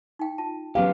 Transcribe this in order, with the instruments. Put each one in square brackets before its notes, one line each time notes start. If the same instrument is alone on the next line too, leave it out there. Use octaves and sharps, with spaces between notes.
[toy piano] D#4 G5
F4 A5
[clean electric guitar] F#3 B3 G4 [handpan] C#4 F5